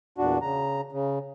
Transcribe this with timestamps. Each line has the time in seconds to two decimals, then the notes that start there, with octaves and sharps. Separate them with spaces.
0.18 E2 A#2 D4 F#4
0.41 C#3 A#5
0.92 C#3